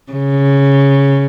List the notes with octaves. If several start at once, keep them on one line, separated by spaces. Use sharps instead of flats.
C#3